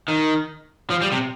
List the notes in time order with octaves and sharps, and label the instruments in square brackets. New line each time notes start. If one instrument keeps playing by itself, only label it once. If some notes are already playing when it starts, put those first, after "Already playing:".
[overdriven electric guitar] D#3
F3
G3
C3